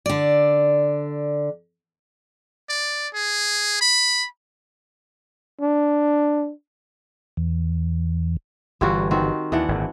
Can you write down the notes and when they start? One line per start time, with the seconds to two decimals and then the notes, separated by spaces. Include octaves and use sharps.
0.06 D3 D5
2.69 D5
3.14 G#4
3.81 B5
5.61 D4
7.37 E2
8.81 G1 E3 G3 F4 F#4
9.11 D#3 C4 F#4
9.52 D#2 E3 D4 F#5
9.68 G#1 A#2